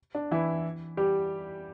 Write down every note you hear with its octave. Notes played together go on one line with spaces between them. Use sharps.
D4
E3 E4
G3 G4